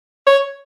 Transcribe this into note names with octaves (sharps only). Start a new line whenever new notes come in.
C#5